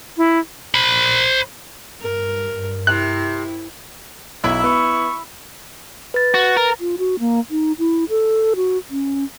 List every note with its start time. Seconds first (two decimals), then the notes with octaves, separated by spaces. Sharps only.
0.17 E4
0.74 C5 B5
2.01 G2 A#4
2.87 C3 E4 F#6
4.44 B1 E4 E6
4.64 B3 C#6
6.14 B4 A6
6.34 F#4
6.57 A#4
6.80 F4
6.98 F#4
7.19 A#3
7.51 D#4
7.79 E4
8.09 A4
8.56 F#4
8.90 C#4